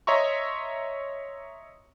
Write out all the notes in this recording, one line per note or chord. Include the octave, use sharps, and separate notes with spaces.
C#5 D#5 E5 A#5 C6 C#6